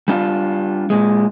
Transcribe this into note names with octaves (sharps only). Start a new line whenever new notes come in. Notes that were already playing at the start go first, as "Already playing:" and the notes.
G3 D4 F4
A#2 G#3